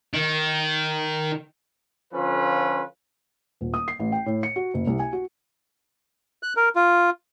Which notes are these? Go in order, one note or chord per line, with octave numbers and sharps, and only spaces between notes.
D#3
D3 F3 C#4 F4 A4 B4
D#1
D#6
C7
A1
G5
A2
C#7
F#4
F#1
C2
G#5
F#4
F#6
A#4
F4